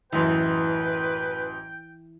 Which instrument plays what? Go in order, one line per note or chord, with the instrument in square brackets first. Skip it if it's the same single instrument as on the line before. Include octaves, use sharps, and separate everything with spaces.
[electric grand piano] A1 F#2 [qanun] E3 [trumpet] B4 [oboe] G5